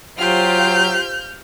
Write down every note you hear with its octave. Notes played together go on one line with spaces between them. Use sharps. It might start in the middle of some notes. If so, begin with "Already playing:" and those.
F#3 F4 G4 C5 F6 G6